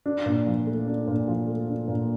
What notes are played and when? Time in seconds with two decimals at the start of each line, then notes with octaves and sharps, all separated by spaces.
0.06 D4
0.26 A#2
0.46 F3
0.67 A3
0.87 D4
1.07 A#2
1.28 F3
1.48 A3
1.68 D4
1.88 A#2